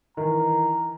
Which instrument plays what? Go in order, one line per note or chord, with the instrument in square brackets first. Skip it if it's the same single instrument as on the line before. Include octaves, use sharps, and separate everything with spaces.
[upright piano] D#3 E3 [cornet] A#5